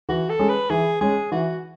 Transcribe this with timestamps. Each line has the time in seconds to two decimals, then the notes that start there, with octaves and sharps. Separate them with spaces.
0.09 E3 F#4
0.29 A4
0.39 G#3 C#4
0.49 B4
0.70 E3 G#4
1.01 G#3 C#4 G#4
1.32 E3 F#4